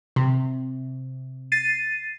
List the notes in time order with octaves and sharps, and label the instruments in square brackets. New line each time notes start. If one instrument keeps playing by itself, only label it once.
[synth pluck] C3
[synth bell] A6 C7 D#7